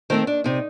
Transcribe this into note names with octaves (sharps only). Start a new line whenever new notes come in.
D#3 A3 C4 C5
D4
C3 D#4